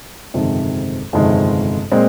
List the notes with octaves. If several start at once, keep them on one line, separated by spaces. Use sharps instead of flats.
G1 F2 C3 D#3 G#3
G1 F2 C3 D#3 G#3
A#2 G#3 C4